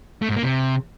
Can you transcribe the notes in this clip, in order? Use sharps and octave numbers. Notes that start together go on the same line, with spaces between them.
A3
G#2
A#3
C3